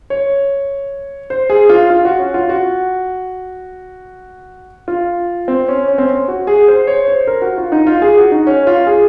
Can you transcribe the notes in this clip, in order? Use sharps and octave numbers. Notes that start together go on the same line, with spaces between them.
C#5
C5
G#4
F4
F4
F#4
C#4
F4
F#4
F4
C4
C#4
C#4
C4
C#4
F#4
G#4
C5
C#5
C5
A#4
F#4
F4
D#4
F4
G#4
F#4
D#4
C#4
F4
G#4